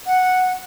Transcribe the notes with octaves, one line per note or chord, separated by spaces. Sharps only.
F#5